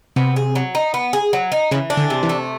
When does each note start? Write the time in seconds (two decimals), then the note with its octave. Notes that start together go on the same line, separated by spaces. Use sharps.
0.16 C3 B3
0.36 G#4
0.55 F#3
0.75 D#4
0.94 B3
1.13 G#4
1.33 F#3
1.52 D#4
1.71 C#3 E3
1.90 D4
1.97 D3
2.10 C3
2.23 E3
2.29 A3